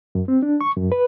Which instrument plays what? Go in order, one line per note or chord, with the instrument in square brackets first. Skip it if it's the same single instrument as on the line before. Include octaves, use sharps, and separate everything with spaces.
[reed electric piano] F#2
C4
D4
C#6
F#2
B4